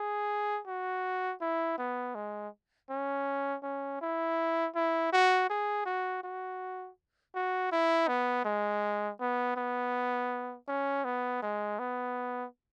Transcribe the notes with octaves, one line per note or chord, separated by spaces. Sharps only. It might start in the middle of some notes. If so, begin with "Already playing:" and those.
Already playing: G#4
F#4
E4
B3
G#3
C#4
C#4
E4
E4
F#4
G#4
F#4
F#4
F#4
E4
B3
G#3
B3
B3
C#4
B3
G#3
B3